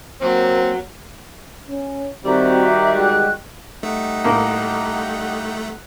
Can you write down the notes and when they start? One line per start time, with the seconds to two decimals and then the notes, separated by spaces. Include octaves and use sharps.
0.22 F#3 A#3 C4
1.69 C#4
2.25 D#3 G3 C4 F#4 E5 A#5
2.93 G#3 F#4 G5 F#6
3.83 G3 A3 D#4 F#5
4.24 A2 A#3